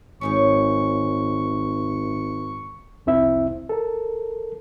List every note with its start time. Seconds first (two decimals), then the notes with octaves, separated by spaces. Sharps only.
0.21 G#1 C#4 D#4 C#5 C#6
3.06 C2 F2 C4 E4 E5
3.69 A4 A#4